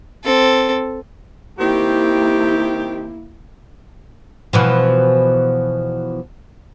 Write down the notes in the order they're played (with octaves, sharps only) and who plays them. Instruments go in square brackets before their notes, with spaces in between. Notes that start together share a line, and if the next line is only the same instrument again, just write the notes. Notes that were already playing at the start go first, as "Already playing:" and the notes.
[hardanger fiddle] C4 A4
[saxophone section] D#3 C4 G4 [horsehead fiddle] A#3 E4
[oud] B2 E3 F3